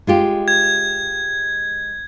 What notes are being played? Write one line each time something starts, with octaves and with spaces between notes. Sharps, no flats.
G#3 F4 G4
G#6